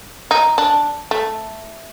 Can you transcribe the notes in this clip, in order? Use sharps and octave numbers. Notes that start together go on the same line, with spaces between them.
D#4
D4
A3